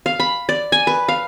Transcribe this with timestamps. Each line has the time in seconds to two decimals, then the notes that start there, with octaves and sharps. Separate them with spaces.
0.06 F5
0.20 B5
0.49 D5
0.72 G#5
0.87 B4
1.08 F5